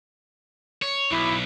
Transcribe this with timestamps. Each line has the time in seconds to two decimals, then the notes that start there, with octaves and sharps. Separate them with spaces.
0.82 C#5
1.11 B1 E4